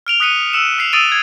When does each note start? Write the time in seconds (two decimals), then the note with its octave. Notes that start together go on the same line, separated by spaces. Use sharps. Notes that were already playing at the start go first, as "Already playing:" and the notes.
0.07 F6 D7 F7 G7
0.20 D#6 F#6 B6 C#7 D#7 F7
0.53 E6 C#7 E7
0.78 F6 B6 C7 F7
0.93 D#6 E6 A6 D7 D#7 F7
1.08 G#6 E7